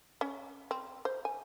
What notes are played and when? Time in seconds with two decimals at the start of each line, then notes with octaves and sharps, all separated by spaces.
0.21 C#4
0.71 C4
1.05 C5
1.25 G#5